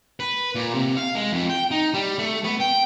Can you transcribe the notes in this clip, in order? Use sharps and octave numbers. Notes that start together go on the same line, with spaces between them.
B4
A#2
C3
F5
G#3
F2
G5
D#4
G3
A3
B3
G5